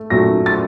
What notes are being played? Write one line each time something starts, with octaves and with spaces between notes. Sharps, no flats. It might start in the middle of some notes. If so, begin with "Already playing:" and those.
Already playing: A3
A#2 F#3 A3 A#6
A6